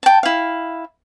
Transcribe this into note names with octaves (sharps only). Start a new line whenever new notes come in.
G5 A5
E4 F5